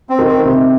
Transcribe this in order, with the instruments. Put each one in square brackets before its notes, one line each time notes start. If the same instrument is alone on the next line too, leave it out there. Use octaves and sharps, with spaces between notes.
[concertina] C4
[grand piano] D#3
[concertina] C4
[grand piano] C3